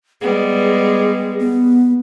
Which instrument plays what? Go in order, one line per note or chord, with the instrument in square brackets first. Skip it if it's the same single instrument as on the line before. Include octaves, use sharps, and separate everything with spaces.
[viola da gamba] G3 G#3 B3 [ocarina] G#4
[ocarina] B3